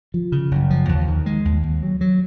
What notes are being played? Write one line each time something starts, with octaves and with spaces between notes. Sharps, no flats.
F3
C#3
F#1
F3
D#2
D#3
G#3
D#2
D#2
F#3
F#3